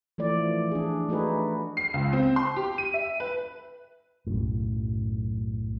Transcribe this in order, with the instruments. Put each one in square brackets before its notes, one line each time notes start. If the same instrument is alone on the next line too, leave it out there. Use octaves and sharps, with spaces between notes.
[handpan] E3 F3 A3 D5
D4 G#4
A3 D#4 F#4 G#4 B4
[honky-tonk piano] C7
C#2
C4
C6
G4
D#7
E5
B4
[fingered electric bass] B1 F#2 A2